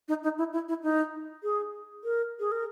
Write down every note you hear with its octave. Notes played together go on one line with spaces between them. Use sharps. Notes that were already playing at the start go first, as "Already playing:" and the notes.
D#4
D#4
E4
E4
E4
D#4
G#4
A#4
G#4
A#4